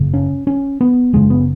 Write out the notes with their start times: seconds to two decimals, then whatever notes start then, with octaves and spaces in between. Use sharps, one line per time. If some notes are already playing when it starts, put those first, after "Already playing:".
Already playing: F#1 F#2 C#3
0.14 C#4
0.47 C#4
0.81 B3
1.13 F#1 F#2 C#3 G#3
1.30 B3